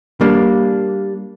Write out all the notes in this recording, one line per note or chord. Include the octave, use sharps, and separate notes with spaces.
G3 A#3 D4